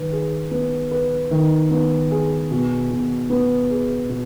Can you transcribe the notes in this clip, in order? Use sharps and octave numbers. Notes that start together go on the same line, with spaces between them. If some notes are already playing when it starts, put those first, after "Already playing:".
Already playing: D#3 B4
G#4
B3
B4
D#3
B3
G#4
B2
B2
B3
G#4
B2